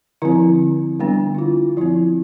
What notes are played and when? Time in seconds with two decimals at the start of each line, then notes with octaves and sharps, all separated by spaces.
0.22 D3 F3 C4 E4
1.00 D3 G3 B3 D4
1.35 E4
1.39 F4
1.77 F3 C4 E4